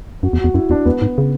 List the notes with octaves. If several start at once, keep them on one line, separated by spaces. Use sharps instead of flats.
F#2 F#4
E2
F#4
E2
F#2 E4
E2 D4
E2 B3
G#2
C#3